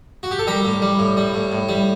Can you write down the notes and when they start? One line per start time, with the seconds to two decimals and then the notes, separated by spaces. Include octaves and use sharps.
0.23 F#4
0.31 G4
0.39 A4
0.47 G3 G4 A#4
0.65 A2
0.82 G3
0.99 A2
1.17 G3
1.34 A2
1.52 A2
1.69 G3